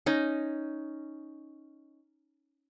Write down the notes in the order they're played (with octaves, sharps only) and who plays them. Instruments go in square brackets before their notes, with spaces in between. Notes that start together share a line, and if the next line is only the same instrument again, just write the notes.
[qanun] C#4 D#4